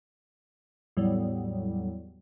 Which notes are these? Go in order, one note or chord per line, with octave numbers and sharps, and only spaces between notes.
E2 A2 F#3 G3